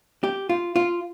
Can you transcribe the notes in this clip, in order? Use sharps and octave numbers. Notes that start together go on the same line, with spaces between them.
G4
F4
F4